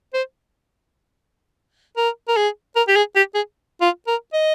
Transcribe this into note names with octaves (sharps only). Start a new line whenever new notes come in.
C5
A#4
A#4
G#4
A#4
G4
G#4
G4
G#4
F4
A#4
D#5